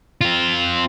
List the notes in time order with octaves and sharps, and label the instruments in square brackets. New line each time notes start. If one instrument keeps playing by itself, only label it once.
[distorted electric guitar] C4 F4